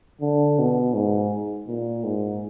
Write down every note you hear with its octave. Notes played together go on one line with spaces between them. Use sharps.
D3
B2
G#2
A#2
G#2